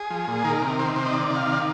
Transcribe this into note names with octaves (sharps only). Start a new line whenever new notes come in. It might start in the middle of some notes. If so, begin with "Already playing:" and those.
Already playing: G#4
F3
A#2
D#3 A#4
C3
D#3 C5
C3
D#5
D#3 D5
C3
F5
D#3
D5